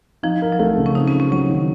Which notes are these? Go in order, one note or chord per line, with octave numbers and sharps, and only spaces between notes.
F3 D#4
A#4
F#3
F3 A3
C#3
C#4
C4 D#4
C#4
F4
C#4
F#3 C#4
D#3